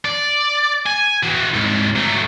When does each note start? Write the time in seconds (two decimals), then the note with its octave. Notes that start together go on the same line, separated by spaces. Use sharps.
0.05 D5
0.86 G#5
1.23 E3 F#4
1.54 C2 G#2
1.96 F#3 A3